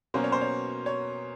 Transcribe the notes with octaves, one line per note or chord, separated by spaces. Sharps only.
B2 F#3 A#3 C#4 C5
C#5
C5
C#5
C#5